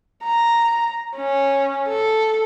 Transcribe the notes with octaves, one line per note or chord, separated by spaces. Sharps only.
A#5
C#4
A4